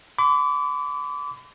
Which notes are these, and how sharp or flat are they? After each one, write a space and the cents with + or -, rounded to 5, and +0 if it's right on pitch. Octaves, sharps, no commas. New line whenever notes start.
B5 +40 D6 -30